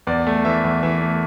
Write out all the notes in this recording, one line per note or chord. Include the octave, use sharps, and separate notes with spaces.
E2 D5
A3
E3 E5
E2
E3 E5
A3